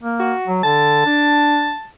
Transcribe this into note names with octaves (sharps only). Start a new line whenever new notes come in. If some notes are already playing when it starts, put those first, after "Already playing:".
A#3
F#4
F#3
D3 A5
D4